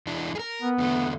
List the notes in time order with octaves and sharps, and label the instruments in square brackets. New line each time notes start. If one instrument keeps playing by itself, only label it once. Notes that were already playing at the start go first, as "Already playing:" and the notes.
[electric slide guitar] E2 E3 D4
G#4 A#4
[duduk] B3
[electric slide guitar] E2 D3 A3